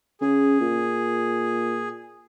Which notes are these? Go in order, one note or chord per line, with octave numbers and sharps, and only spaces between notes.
C#3 G#4
A#2